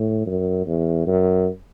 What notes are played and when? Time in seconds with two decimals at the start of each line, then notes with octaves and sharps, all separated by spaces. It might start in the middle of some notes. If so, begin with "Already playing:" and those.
Already playing: A2
0.26 F#2
0.67 E2
1.07 F#2